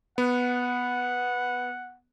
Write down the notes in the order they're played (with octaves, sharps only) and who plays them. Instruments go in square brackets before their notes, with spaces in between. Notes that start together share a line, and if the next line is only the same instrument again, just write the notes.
[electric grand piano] B3 [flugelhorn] F#5